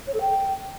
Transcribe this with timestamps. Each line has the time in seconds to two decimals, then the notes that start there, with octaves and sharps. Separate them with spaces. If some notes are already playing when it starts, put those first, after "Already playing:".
0.07 C#5
0.14 A4
0.21 G5